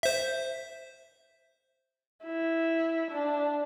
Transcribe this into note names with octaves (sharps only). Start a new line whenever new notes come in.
C5 E5
E4
D4